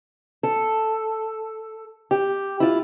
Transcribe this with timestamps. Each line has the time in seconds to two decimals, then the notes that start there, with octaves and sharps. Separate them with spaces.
0.43 A4
2.11 G4
2.60 E4 F4